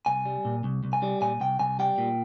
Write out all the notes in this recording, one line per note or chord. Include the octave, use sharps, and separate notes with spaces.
C2 G#5
G3
A#2
C2
C2
G#5
G3
A#2 G#5
C2 G5
C2 G#5
G3 G5
A#2